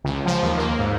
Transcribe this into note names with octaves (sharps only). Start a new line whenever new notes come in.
C#2
F3
D#2
A#3
G#2